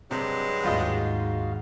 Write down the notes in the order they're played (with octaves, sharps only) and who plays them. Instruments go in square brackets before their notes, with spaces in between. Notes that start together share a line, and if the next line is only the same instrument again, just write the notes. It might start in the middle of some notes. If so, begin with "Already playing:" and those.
[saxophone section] G2 F#3 G#3 [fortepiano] C3
[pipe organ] D#2 F#4 F5 [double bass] G#2 [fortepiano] G3 F4 D#5